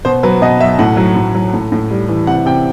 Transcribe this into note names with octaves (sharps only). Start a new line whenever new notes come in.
B2 C5
F#3 B4
B2 D#5
F#3 E5
A2 F#5
F#3
A2
F#3
A2
A2
G3
E3
C3 F#5
C3 G5